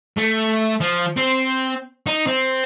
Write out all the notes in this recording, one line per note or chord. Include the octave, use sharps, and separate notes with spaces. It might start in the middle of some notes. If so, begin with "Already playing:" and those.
A3
F3
C4
D#4
C4